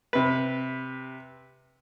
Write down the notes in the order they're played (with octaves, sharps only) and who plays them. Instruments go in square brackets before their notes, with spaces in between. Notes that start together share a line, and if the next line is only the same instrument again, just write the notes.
[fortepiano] C3 B4